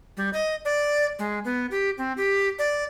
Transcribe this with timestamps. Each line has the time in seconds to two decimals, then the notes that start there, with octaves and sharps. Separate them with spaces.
0.17 G3
0.33 D#5
0.65 D5
1.19 G#3
1.45 B3
1.71 G4
1.98 C4
2.17 G4
2.59 D5